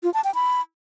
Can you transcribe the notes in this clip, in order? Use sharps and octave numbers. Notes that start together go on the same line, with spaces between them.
F4
A5
G5
B5